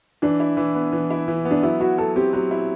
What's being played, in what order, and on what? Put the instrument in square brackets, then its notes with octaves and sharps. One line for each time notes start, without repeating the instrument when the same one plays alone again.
[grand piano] E3 [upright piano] D4
[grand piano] E4
E3
B3
E3
E4
E3
B3
[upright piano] D4
[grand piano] F#3 [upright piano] E4
[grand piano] E4 [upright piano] F#4
[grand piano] F#3 [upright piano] A4
[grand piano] C4 [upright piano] G4
[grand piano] F#3 [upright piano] G4
[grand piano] E4